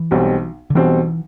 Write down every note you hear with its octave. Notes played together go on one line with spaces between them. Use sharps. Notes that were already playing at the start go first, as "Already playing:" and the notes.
Already playing: E3
B1 B2 G3 C4
D3
B1 B2 E3 G3 C4